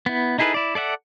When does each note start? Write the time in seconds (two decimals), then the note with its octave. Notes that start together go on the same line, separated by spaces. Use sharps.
0.06 B3 E4
0.39 D#4 E4 G#4 A4 B4
0.54 E4 D5
0.75 A4 D5 E5 F#5